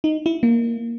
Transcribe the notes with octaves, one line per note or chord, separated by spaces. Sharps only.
D#4
E4
A#3